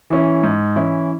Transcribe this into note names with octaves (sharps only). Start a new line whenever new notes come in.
E3 C#4 E4
G#2
E3 C#4 E4